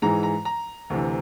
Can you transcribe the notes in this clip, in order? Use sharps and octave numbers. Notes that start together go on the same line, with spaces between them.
G#2 E3 G#3 A#5
A#5
A#5
D2 C3 E3